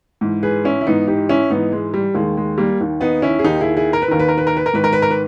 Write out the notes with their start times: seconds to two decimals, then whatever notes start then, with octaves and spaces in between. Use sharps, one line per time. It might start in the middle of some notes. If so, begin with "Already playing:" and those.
0.21 G#2 E3
0.43 G#4 B4
0.65 C#4 E4
0.81 E4
0.86 G#2 E3 B3 D#4
1.08 D#4 G4
1.29 C#4 E4
1.50 G#2 E3 B3 D#4
1.72 G#3
1.94 G3
2.15 D#2 D#3 G#3
2.37 G#3
2.58 G3 A#3
2.80 D#2 D#3
3.01 B3 D#4
3.22 C#4 E4
3.39 G#4
3.44 D#2 D#3 D#4 G4
3.61 E4 G#4
3.76 E4 G#4
3.93 A#4
4.02 B4
4.08 D#2 D#3 A#4
4.19 B4
4.28 A#4
4.38 B4
4.47 A#4
4.57 B4
4.66 A#4
4.73 G#2 D#3 B4
4.84 A#4
4.93 B4
5.02 A#4
5.11 B4